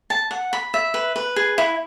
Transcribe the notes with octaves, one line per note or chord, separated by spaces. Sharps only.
A5
F#5
B5
E5
B4
B4
G#4
E4